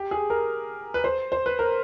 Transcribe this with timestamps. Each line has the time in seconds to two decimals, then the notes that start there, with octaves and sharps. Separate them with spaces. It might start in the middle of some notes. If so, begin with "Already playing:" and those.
Already playing: G4
0.11 G#4
0.30 A#4
0.94 B4
1.04 C5
1.32 C5
1.46 B4
1.59 A#4